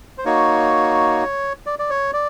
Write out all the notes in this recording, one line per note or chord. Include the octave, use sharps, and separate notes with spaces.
C5
A#3 D#4 F#4 C#5
D5
D5
C#5
D5